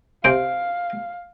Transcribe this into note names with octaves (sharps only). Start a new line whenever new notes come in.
C3 C5 F5 D6